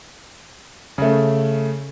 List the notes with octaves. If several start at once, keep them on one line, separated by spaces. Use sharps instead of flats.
C#3 A3